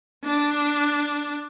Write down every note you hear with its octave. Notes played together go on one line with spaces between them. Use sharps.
D4